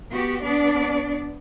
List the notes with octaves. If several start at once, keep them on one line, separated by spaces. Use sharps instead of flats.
B3 F#4 G4
B3 D4 D5